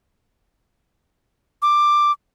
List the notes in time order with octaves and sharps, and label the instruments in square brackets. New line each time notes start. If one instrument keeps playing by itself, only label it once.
[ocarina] D6